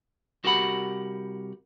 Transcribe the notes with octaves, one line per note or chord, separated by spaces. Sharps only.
C2 F#4 G4 A#4 F#5 B5